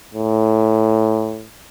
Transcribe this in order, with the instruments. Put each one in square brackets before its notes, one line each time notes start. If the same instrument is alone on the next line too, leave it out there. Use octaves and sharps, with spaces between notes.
[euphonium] A2